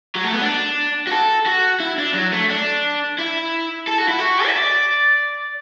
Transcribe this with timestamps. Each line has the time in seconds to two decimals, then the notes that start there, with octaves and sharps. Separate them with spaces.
0.15 F#3
0.24 A3
0.33 B3
0.42 D4
1.07 F#4
1.11 A4
1.46 F#4
1.80 E4
1.98 D4
2.14 F#3
2.32 A3
2.50 D4
3.18 E4
3.87 A4
3.98 F#4
4.09 E4
4.19 F#4
4.47 E5
4.57 D5